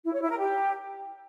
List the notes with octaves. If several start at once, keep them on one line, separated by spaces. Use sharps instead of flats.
E4
C#5
E4
A#4
G4